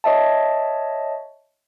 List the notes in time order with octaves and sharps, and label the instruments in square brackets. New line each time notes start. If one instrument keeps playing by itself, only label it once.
[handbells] C#5 D#5 E5 A5